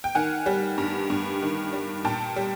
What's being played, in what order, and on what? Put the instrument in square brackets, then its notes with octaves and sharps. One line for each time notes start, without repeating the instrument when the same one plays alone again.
[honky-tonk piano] G5
D#3 F#5 G#5
G3
G2
G2
D#3
G3
A#2 G5 A5
G3